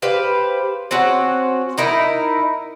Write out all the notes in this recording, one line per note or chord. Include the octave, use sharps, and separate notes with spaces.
G4 B4 C5 F5
C4 C#4 F#4
D#4 E4 A#4